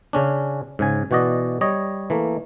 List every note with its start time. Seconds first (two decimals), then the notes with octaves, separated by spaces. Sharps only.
0.13 C#3 C#4 D4
0.79 G#2 C#3 G#5
1.11 B2 E3 F#4 D5 D#5
1.61 G3 C#5 D#5
2.10 E3 A3 A#3